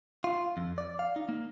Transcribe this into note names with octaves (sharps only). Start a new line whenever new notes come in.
F4
F2
D5
F5
D#4
A#3